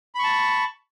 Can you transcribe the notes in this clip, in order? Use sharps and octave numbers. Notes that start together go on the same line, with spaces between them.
A5 B5 C#6